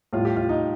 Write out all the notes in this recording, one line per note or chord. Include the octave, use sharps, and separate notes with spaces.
A2 G3 F4
G4
F4
D#4